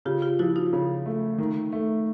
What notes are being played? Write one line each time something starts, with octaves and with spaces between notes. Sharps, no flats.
C#3 F4 G4
F4 G4
F3 E4 F#4
D#4 F4
C#3
A3
D#3
A3